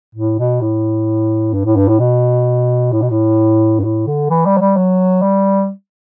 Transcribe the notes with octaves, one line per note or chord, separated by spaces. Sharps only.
A2
B2
A2
G2
A2
G2
A2
B2
A2
B2
A2
G2
A2
D3
E3
G3
F#3
G3
F#3
G3